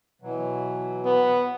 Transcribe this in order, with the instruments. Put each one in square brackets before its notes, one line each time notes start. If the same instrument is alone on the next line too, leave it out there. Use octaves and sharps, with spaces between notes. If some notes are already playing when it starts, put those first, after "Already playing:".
[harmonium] B2 E3 F#3
[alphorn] B3